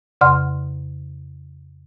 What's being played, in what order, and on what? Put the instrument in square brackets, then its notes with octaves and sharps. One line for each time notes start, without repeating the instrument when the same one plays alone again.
[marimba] F2 C#3 D5 F#5 C6 F6